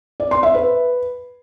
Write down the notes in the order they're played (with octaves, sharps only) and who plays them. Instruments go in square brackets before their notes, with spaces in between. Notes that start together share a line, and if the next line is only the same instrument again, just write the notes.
[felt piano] D5
C6
E5
B4